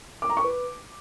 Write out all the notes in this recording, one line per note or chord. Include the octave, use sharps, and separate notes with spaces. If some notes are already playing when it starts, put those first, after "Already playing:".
D6
A#5
C#6
B4